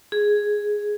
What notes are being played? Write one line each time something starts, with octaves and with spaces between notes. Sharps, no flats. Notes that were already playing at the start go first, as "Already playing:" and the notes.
G#4